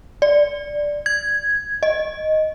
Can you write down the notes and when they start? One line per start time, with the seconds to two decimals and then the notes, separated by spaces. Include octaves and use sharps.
0.22 D5
1.06 G#6
1.83 D#5